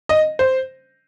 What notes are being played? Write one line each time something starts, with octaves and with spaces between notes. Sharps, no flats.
D#5
C5